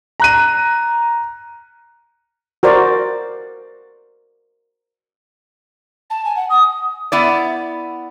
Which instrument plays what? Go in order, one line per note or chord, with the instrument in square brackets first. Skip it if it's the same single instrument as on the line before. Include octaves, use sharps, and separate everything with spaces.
[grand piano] A#5 F#6 D#7
[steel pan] F#4 A#4 C5 D5
[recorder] A5
G#5
F#5
D#6
[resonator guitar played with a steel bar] B3 E4 D5